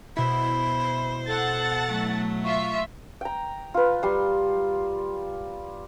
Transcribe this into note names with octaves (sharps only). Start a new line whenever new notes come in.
B2 E4 C5 B5
A4 F#5 A5 A6
F#3 A3
F4 E5 C#6
G5 A#5
F4 B4
G3 C6